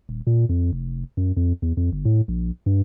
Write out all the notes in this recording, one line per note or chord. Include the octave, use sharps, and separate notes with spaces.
D#1
A#2
F2
F1
F#2
F2
E2
F2
G1
A2
A#1
G2